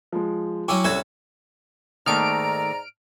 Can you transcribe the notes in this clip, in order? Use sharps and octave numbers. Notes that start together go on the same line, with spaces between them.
F3 G#3
F#3 C#4 E4 G5 C#6 D6
C2 C#4 F#4 A4 G#6
G#2 D#3 A3 A#3 D5 A#5 F6 D7